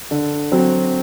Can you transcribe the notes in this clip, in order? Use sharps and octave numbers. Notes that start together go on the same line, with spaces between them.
D3
F#3 C4